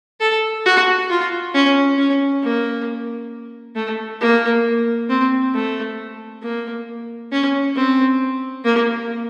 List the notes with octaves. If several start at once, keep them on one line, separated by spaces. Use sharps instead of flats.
A4
F#4
F4
C#4
C#4
A#3
A3
A#3
C4
A3
A#3
C#4
C4
A#3